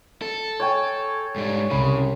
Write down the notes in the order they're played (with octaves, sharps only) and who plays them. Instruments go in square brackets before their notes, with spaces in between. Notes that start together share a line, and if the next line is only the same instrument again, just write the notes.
[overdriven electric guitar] A4
[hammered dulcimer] C#5 G5 G#5
[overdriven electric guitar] G#2 G3
[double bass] C2 [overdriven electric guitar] C#3 [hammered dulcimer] B5